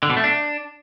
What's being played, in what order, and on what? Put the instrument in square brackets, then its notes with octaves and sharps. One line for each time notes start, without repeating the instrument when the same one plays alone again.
[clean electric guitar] D3
B2
A3
D4